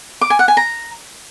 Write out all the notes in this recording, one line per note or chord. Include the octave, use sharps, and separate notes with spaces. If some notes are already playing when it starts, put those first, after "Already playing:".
D6
G#5
F#5
G#5
A#5